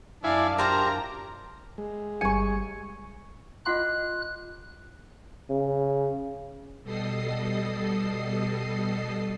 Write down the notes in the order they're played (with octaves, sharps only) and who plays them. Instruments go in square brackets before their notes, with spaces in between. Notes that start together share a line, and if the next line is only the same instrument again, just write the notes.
[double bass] F#2 D4 [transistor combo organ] E4 G#5 [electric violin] D5 F5
[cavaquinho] F4 C5 F5 [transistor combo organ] G4 A#4 [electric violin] A#5
[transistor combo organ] G#3
[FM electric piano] G1 G3 C#7 [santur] G#5 C#6
[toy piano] F4 F#5 C6 [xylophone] D#5 B5 D6 [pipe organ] F#6
[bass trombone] C#3
[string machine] B2 G3 A4 D#5 D#6 C7